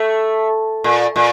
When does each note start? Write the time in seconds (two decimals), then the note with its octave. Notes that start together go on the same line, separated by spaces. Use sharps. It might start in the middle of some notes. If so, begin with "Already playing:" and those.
Already playing: A3
0.84 A#2
1.16 A#2